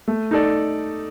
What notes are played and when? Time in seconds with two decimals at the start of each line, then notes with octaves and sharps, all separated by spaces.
0.08 A3
0.31 D#4 A4 D5